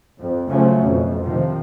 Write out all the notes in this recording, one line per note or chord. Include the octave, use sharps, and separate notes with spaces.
F2
C#3 F3 F#3 A3 C#4
F2 B2
C3 D#3 F3